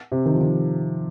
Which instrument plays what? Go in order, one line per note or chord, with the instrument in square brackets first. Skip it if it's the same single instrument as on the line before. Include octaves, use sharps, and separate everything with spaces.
[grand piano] C3
D#3
F3
D#3